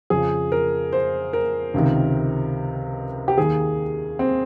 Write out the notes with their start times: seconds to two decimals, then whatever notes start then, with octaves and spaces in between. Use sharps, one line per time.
0.10 F2 C#3 F3 G#4
0.52 A#4
0.93 C5
1.33 A#4
1.74 C#2 C3 D#3
3.28 G4
3.37 D#2 D#3 G#4
4.19 C4